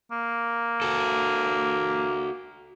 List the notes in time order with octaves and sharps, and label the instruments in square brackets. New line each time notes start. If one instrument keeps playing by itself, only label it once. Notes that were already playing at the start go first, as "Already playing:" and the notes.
[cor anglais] A#3
[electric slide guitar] F#4 A4